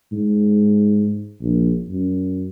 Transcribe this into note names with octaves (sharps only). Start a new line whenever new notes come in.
G#2
A#1
F#2